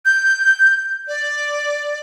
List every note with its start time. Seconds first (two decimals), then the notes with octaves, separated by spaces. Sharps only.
0.05 G6
1.08 D5